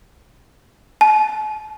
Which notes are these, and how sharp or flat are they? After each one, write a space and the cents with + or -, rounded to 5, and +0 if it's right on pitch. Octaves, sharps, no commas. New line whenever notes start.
A5 -45